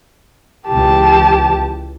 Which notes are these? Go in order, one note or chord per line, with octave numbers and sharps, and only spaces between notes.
C#2 E3 G4 A5